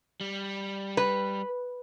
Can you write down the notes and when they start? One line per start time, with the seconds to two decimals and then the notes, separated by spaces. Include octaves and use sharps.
0.21 G3
0.97 B4